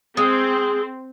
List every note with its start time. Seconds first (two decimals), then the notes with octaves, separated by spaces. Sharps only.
0.17 G#3 C4